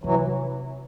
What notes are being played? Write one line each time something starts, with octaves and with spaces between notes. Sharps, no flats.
C3 E3 F#3